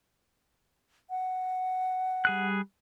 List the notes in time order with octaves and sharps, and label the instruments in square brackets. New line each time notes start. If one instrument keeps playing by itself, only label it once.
[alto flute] F#5
[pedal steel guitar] G3 G#4 F#6